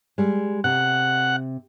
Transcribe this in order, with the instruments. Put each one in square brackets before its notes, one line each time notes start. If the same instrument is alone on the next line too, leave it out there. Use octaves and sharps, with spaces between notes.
[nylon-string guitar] G3 G#3
[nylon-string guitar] C3 [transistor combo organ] F#5